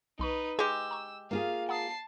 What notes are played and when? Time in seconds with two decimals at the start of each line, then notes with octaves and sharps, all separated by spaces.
0.19 B1 D#4 B4 B5 C#6
0.59 G#3 G4 G#4 E6
0.91 A#5 C#6
1.31 A#3 F4 G#4 F5
1.69 F#5 A5 A#5 D#6 C7